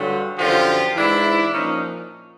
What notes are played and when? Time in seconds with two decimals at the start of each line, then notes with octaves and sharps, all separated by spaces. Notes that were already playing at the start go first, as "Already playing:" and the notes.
Already playing: G2 D3 F#3 F4 G4
0.37 F#2 D3 F3 F4 G4
0.95 G#2 E3 D4 E4
1.52 A#2 F3 C#4 D#4